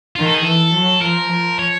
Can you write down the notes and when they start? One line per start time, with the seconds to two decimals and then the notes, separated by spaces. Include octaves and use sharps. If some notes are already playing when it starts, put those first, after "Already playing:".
0.16 D#3 F4
0.25 A4
0.35 G#4
0.45 E3 A4
0.73 F#3
1.01 F3 A#4
1.31 F3
1.59 C#5